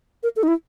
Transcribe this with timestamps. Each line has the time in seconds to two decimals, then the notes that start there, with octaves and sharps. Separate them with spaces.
0.23 A#4
0.36 A4
0.43 D#4
0.48 E4